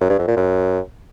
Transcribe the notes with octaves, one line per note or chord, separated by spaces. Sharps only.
F#2
G2
F2
A#2
F#2